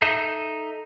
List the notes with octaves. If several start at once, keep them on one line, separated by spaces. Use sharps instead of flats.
D#4 A4 E5 G6